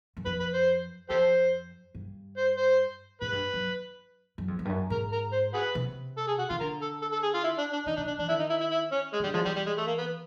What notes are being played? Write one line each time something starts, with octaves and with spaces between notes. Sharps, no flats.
F#2
F2 B4
B4
C5
F2 G4 A4 C5
G2
C5
C5
G#2 B4
G2
F#2
F#2
F2
F#2
G2
F#2
G#2 A#4
A#4
C5
F#4 G#4 B4
C3
A4
G#4
F#4
D#3 F4
D3 A#4
A4
A4
A4
G#4
F4
E4
D4
D4
D#3 D#4
C#3 D4
D4
E3 D4
D#3 E4
D#4
E4
E4
E4
C#4
G#3
D#3
D3 G3
F3 G#3
E3 G3
G3
G#3
A3
A#3
B3